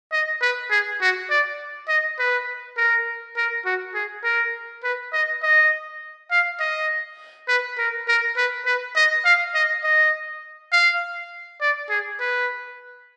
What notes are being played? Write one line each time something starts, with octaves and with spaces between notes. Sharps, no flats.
D#5
B4
G#4
F#4
D5
D#5
B4
A#4
A#4
F#4
G#4
A#4
B4
D#5
D#5
F5
D#5
B4
A#4
A#4
B4
B4
D#5
F5
D#5
D#5
F5
D5
G#4
B4